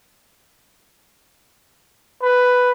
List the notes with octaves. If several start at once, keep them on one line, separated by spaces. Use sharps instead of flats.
B4